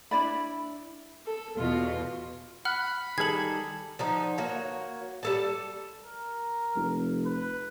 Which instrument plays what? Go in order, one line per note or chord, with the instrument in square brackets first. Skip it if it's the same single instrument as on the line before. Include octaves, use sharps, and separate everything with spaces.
[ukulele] D4 E4 D5 B5
[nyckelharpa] A4
[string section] E2 B2 [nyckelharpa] F4
[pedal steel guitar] F#5 [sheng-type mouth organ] B5 [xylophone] F6 F#6
[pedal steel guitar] D#3 G3 [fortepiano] G#4 A4 [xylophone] G#6 F#7
[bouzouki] D3 F3 D#4
A#3 F#4 C#5
G3 A4 A5
[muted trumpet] A#4
[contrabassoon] F1
[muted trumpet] B4